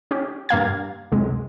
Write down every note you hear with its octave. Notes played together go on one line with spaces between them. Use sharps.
C#4 G4
G2 A#3 F5 G#6
C#2 F#2 C3 G#3